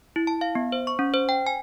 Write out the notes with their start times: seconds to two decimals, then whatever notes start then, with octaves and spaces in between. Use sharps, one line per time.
0.16 E4
0.27 A5
0.41 F5
0.55 B3
0.72 C5
0.87 C#6
0.99 C#4
1.14 C5
1.29 G5
1.47 G#5